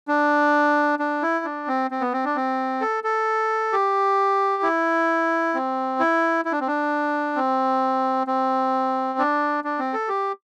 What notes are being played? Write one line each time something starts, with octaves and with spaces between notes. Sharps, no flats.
D4
D4
E4
D4
C4
C4
B3
C4
D4
C4
A4
A4
G4
E4
C4
E4
E4
D4
C4
D4
C4
C4
D4
D4
C4
A4
G4